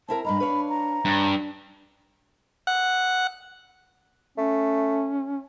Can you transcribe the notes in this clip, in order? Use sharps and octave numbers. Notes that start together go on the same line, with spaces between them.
C4 E4 A#4 A5
G2 D#5 F5 A#5 B5
D4 B4 C#5 F5
A#5
G2 D4
F#5
A3 C#4